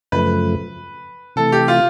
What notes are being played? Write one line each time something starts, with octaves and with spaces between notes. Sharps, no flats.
F#2 C#3 F3 A3 B4
C3 E3 A3 A4
G4
F4